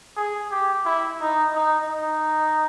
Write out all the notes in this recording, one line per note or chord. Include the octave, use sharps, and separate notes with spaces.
G#4
G4
E4
D#4
D#4
D#4